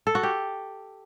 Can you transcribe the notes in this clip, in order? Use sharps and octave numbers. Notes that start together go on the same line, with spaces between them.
A4
F#4
G4